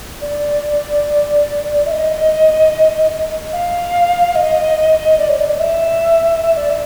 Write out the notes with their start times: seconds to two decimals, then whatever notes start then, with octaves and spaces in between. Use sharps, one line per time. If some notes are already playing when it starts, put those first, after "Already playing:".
0.21 D5
1.87 E5
1.91 D#5
3.53 F5
4.35 D#5
5.18 D5
5.28 C#5
5.39 D5
5.49 D#5
5.60 E5
6.42 E5
6.57 D5
6.70 E5